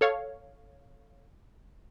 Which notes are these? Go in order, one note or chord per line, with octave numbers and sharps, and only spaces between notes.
A4 C#5 F5